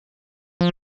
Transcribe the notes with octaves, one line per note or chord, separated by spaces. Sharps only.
F3